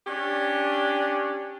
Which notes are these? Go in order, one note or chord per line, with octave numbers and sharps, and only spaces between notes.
C#4 D4 G4